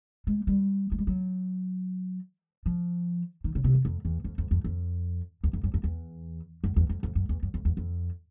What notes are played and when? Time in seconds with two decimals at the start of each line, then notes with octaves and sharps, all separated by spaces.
0.27 G#3
0.47 G3
0.92 G#3
0.98 G3
1.07 F#3
2.66 F3
3.44 D#3
3.55 C#3
3.64 C3
3.74 F#2
3.85 F2
4.05 E2
4.24 F2
4.38 F2
4.51 F2
4.64 F2
5.44 E2
5.53 F2
5.64 F#2
5.74 F2
5.84 E2
6.64 F#2
6.76 E2
6.89 F2
7.03 F2
7.15 F#2
7.29 E2
7.42 F#2
7.54 F2
7.65 E2
7.77 F2